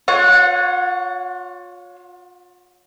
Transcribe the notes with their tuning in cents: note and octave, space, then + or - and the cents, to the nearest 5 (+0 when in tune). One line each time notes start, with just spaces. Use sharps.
F4 +35 C#5 +15 F#5 -15